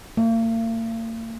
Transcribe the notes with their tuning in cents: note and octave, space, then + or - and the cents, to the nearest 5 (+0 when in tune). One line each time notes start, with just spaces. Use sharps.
A#3 -45